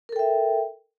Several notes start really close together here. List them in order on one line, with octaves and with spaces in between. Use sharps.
A#4 A4 G5 E5